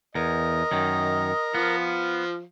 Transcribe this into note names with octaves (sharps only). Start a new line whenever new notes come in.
E2 A#4 D#5
F#2 D#3
F3 B3 F5